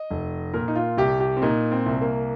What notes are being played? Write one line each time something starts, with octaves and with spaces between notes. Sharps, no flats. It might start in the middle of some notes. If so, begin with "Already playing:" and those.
Already playing: D#5
F1
A#2 A#4
D#4
F4
C2 G4
G4
C4
A#2 D#4
C4
C2
A#3